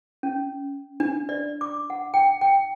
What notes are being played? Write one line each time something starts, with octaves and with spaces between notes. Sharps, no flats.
C#4
D4
D5
D6
F#5
G5
G5